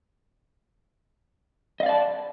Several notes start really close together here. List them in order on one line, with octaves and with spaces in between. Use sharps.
D#5 F5 D5 A5